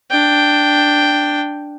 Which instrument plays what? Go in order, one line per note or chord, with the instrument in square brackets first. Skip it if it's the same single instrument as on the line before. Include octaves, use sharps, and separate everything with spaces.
[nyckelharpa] D4 G5